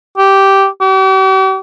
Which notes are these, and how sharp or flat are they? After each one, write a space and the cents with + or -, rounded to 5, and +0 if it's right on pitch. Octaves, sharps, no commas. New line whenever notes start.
G4 -10
G4 -45